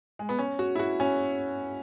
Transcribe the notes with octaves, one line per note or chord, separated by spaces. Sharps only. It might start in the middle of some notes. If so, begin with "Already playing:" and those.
G#3
B3
C#4
F#4
E4
F#4
C#4